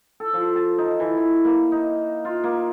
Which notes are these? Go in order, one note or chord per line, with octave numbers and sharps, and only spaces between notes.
A4
F3
A5
D#4
E3
E3
A#3
D#4
F4
A#3